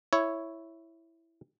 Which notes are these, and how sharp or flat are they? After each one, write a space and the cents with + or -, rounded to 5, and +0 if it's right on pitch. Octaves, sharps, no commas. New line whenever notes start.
E4 +0 C#5 +0